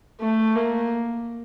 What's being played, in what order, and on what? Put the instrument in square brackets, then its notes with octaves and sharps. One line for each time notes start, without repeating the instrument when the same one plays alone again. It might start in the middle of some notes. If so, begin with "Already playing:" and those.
[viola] A3
A#3